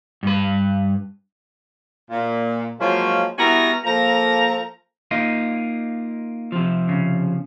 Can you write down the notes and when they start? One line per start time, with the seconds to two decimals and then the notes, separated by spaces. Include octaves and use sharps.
0.23 G2 B4
2.11 A#2
2.80 F3 F#3 G#3 A#3 C#4 F4
3.38 G3 B3 E4 F#4 G#5 A#5
3.85 F3 A#3 A4 A#5
5.11 A#3 D#4 F4
6.52 C3 F3
6.89 C#3